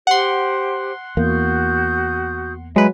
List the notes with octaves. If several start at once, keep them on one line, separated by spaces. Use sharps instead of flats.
G4 C5 F#5 C6
E2 A#3 F#4 D#6 G6
F#3 G#3 B4 E5 A#5